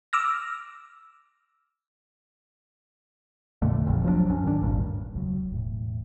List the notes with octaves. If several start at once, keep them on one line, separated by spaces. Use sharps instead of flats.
D6 E6 F6 A#6
F2 A#2 D3 A3
F1 A#1 F2
F3 F#3 A3 D4
C2 F#2 F#3 C#4
G#2 D#3 D4
G#1 D2 G2 A#2
E1 C#2 D3 F#3
E1 A2